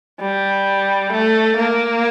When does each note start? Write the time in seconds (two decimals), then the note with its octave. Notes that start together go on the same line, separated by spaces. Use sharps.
0.21 G3
1.12 A3
1.57 A#3